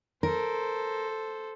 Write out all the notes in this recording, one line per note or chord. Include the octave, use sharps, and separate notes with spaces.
A4 A#4 C5